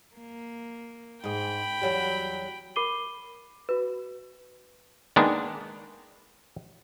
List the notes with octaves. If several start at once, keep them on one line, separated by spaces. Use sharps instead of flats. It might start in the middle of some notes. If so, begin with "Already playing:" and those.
A#3
G#2 G#4 G5 B5
E2 F#3 G3
A#4 B5 D6 C7 D#7 G7
F#4 B4
D#3 G#3 A#3 B3 D4 D#4